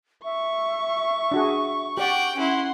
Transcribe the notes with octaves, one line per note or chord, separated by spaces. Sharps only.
E5 C#6
D4 F#4 G#4
G4 D5 F#5 G5
C#4 E4 F#5 C6